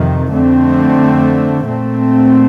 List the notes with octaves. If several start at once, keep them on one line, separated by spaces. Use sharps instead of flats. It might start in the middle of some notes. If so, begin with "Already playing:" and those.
Already playing: F2 C3 D#3
F2 D3 A3 C4
A#2 A3 C4